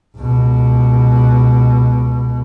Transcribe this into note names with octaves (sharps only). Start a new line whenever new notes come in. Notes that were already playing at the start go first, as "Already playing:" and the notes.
C#2 B2